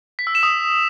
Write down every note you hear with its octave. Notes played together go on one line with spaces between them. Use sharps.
B6
E6
E7
D#6